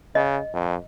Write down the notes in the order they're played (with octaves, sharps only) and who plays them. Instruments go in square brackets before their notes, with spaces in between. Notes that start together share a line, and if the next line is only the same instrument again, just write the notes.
[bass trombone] C#3 [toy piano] D#5
[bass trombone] F2